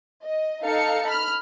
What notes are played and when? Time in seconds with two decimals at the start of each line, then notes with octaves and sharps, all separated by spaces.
0.22 D#5
0.62 D#4 A4 F5 C#7
1.06 B5 F6